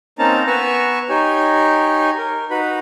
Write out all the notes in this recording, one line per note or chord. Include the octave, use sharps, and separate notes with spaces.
A#3 C4 C#4 D#4 A5 A#5
B3 B4 G#5 A#5 C#6 E6
D#4 G4 C#5 G#5
A#4
D#4 F#4 B4 B5